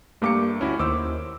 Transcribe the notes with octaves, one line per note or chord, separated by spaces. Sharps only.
G2 A3 A#3 G4 D6 C#7
D2 C#4 E4 F#4
D#2 D#3 C5 D6 E6